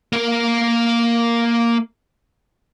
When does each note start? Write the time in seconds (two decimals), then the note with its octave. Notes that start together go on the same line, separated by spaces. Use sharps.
0.13 A#3 A#4